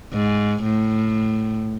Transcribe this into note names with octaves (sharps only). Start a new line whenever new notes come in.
G#2
A2